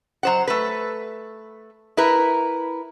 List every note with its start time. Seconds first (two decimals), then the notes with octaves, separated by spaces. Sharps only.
0.23 F#3 C5 F#5
0.47 A3 B4
1.97 E4 A#4 B4